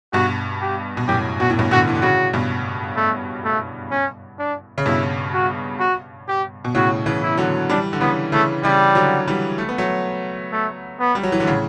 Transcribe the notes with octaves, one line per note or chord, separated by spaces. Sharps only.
G2 B2 F#4
G4
B2
F#2 A2 G4
B2 F#4
A2
G2 B2
B2 D3 F#4
E3
D3
A2 C#3 F#4
G2 B2
A3
A3
C#4
D4
C#3
G2 B2 E4
F#4
F#4
G4
B2
A2 C#3 F#4
C#3 E3
E4
D3 F#3
E3 G3 D4
D3
C#3 E3 B3
C#3 E3 A3
C#3 E3 G3
D3 F#3
E3 G3
A3
B3
F#3 A3
A3
B3
G3
F#3
E3
D3
A2 C#3